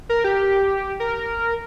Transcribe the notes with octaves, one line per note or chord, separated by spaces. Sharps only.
A#4
G4
A#4